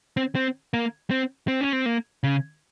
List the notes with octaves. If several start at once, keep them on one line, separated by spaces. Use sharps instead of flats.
C4
C4
A#3
C4
C4
C#4
C4
A#3
C#3